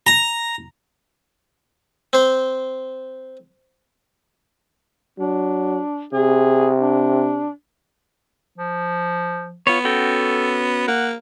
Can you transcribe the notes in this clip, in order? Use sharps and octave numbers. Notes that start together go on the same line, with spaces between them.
A#5
C4 C5
F#3 D4
C3 G#4
D4
F3
B3 F4 C#5
C#4 F#4 A4 G5
A#3 F#5